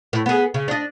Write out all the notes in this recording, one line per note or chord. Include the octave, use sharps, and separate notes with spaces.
A2
B3 G#4
C#3
D4 D#5